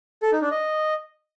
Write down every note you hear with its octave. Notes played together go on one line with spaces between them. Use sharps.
A4
D#4
D4
D#5